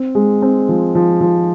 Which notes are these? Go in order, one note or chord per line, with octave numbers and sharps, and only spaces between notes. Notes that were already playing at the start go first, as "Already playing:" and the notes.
Already playing: C4
G#3
C4
F3
F3
F3